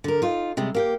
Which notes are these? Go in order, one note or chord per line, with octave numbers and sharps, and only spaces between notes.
D3 A#4
D#4 F4
C3 G3 G#3
A#3 G4 G5